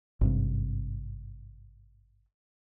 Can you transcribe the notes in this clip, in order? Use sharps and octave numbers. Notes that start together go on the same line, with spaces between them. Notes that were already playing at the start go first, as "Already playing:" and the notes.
G#1 G2 C3